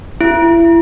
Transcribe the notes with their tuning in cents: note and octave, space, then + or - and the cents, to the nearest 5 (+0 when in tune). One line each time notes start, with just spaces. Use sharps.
E4 +30